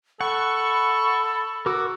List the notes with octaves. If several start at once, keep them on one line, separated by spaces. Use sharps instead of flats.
A4 F#5 B5 C#6
F#4 A#4 D6 E6